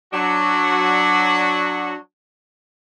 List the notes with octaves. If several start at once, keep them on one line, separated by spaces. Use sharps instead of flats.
F#3 D4 F#4